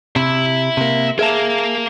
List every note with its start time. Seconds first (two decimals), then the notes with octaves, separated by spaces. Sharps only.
0.16 C3 E5 B5
0.77 C3 A#3
1.19 G#4 A#4 E5 F5 A5